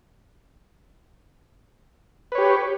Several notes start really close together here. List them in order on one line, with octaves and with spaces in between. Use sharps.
B4 C#5 G4